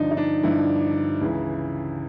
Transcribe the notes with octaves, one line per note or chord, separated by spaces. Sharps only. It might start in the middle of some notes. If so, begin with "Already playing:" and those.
Already playing: G2 D3 F3 D4 D#4
D#4
D4
G2 D3 F3 E4
C#2 C#3 E3